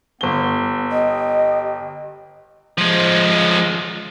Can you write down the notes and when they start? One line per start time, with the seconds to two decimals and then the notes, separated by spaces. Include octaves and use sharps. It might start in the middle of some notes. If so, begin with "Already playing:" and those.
0.21 G1 B3 G7
0.91 G4 D#5 G5
2.78 F3 G#3